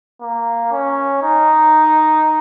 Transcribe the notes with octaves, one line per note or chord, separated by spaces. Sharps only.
A#3
C#4
D#4